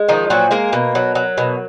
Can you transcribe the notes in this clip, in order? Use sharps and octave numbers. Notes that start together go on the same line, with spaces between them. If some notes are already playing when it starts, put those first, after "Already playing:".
Already playing: G#3
D#3 F3 D#4
A#2 F#3 F#4
G#3 A#3 A#4
B2
F#3
F#3
B2